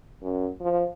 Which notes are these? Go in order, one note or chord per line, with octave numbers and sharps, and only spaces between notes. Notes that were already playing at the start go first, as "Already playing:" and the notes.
F#2
F3